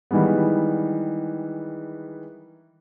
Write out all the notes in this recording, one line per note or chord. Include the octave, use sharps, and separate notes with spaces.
D#3 E3 G3 G#3 B3